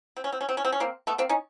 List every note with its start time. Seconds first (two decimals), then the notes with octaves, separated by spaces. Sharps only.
0.17 C4
0.24 C#4
0.32 C4
0.41 C#4
0.49 C4
0.57 C#4
0.65 C4
0.72 C#4
0.80 A#3 C4
1.07 A3 B3
1.18 A#3 C4
1.29 C#4 D#4